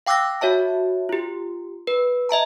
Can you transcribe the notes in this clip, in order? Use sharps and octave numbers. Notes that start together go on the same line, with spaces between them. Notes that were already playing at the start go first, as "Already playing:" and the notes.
F5 G5 D6 E6 F#6 A#6
F#4 C#5 E5 A5
F4 G4
B4
D#5 E5 A5 A#5